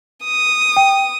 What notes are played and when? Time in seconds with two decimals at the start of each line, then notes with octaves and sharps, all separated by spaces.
0.24 D#6
0.77 G5